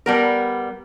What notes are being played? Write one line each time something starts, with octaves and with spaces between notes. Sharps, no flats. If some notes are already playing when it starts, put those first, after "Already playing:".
G3 B3 A#4